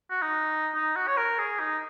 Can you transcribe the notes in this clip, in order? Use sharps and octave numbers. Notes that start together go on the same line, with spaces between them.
F#4
D#4
D#4
F#4
C#5
A#4
G#4
D#4